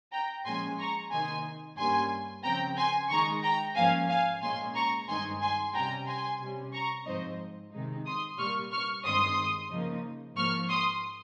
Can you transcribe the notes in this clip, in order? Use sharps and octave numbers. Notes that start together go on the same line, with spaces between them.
G5 A#5
A#2 F3 G#3 C#4 G#5 C6
A#5 C#6
C3 D#3 A#3 D#4 G#5 C6
G2 G3 A#3 C#4 G#5 C6
C#3 F3 C4 G5 A#5
G#5 C6
D#3 G#3 D#4 A#5 C#6
G5 A#5
G#2 F3 A#3 C#4 F5 G#5
F5 G#5
A#2 G#3 C#4 G#5 C6
A#5 C#6
G2 D#3 G#3 C4 D#4 G#5 C6
G#5 C6
C3 G3 C#4 G5 A#5
G#5 C6
C3 G3 C#4
A#5 C#6
G#2 F3 C4 D#4 C5 D#5
C3 D#3 G#3 D#4
C6 D#6
A#2 G3 A#3 C#6 F6
C#6 F6
G2 D#3 G#3 C4 C6 D#6
C#3 F3 A#3 D#4
G#2 F3 A#3 C#6 F6
C6 D#6